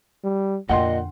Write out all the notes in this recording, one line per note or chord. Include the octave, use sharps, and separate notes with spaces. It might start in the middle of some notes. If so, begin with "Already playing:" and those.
G3
F2 A#2 D3 D#5 F#5 G5 C6